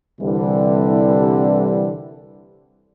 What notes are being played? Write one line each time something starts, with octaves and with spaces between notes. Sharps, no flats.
C2 D3 E3 G3